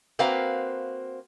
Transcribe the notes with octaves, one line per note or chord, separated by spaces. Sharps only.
A#3 C4 F#4 B4 F5 A#5